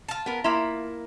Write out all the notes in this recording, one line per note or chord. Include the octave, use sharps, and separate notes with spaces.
F4 A5
B3 A#4
A#3 E4 E5 A#5 C6